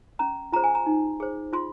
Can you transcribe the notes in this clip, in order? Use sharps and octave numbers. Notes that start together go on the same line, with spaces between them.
C#4 A#5
F4 G#4 C5 A#5
G#5
A#5
D#4
G#4 C5
F4 C6